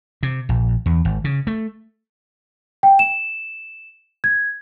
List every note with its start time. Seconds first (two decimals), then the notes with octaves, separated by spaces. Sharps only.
0.23 C3
0.49 A#1
0.86 E2
1.05 G#1
1.24 C#3
1.47 A3
2.83 G5
2.99 E7
4.24 G#6